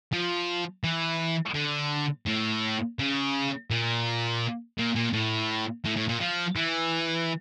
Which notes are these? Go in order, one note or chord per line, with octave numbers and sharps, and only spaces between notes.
F3
E3
D3
A2
C#3
A#2
A#2
A#2
A2
A2
A2
A#2
F3
E3